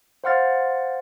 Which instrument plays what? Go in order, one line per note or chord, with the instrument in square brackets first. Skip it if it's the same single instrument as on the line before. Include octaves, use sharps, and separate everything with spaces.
[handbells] C5 F5 F#5 C6 F6 A6